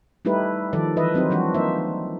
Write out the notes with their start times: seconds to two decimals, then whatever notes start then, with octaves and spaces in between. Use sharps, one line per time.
0.25 G3 A3 D#4 E4 G4 B4
0.73 D#3 F3 A4 D5
0.97 E3 B4 D#5 E5
1.14 F#3 C4 D#4 G4
1.30 E3 F3 G3 D4 F#4
1.54 A#3 D#4 C5 E5